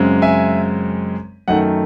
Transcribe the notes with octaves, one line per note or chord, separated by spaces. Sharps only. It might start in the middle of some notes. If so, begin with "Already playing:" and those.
Already playing: F#2 C#3 G#3 C4
E5 G#5
F#2 D#3 A3 F#5